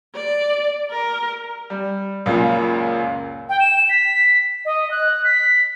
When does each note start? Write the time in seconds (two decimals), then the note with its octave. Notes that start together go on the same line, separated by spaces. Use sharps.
0.15 D5
0.90 A#4
1.70 G3
2.26 C#2 F#2 A#2 C#3
3.49 G5
3.60 E7
3.89 B6
4.65 D#5
4.91 F#6
5.25 B6